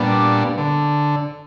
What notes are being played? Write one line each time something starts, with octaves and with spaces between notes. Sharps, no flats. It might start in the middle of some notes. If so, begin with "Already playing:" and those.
Already playing: A#2 G3 B3 D4
D3